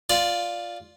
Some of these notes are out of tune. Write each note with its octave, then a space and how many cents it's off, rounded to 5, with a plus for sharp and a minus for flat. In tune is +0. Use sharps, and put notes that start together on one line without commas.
F4 +0 D5 +0